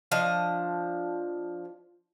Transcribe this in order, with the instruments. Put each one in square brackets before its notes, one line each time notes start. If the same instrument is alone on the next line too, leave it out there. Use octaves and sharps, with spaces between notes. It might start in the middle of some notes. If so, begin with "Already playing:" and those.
[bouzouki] F3 D4 D#5